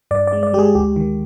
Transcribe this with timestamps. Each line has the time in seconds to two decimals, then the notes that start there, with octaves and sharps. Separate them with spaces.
0.11 G2 D5
0.27 D5
0.33 G#3
0.43 D5
0.54 G#3 G4
0.59 G#4
0.75 D2 G4
0.96 D#3